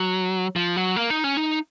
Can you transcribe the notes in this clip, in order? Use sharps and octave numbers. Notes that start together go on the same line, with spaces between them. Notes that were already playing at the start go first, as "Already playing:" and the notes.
Already playing: F#3
F3
F#3
A#3
D#4
C#4
D#4